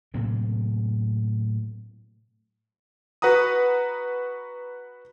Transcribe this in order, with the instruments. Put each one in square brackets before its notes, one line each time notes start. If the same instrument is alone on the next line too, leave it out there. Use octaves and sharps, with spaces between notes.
[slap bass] A2 C3 F#3 A#3
[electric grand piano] F#4 B4 F#5 A#5 D#6